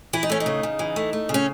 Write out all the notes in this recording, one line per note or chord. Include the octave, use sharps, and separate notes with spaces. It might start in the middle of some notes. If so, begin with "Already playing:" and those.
E3 E4
D#4
A3 C#4
D#4
C#3
C#3
E3
A3
A3
C#3
C#4